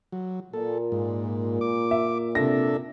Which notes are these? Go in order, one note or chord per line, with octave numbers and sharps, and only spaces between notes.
F#3
A#2 A4
G#2
D6
E5
C3 D4 A4 E5 A#6